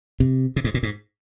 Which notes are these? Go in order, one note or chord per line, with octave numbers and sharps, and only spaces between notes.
C3
C3
G#2
A#2
G#2